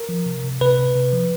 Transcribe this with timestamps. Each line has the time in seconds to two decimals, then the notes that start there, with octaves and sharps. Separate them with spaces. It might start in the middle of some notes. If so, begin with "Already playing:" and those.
Already playing: A#4
0.09 F3
0.26 C3
0.44 C3
0.61 C3 B4
0.78 C3
0.96 C3
1.12 F3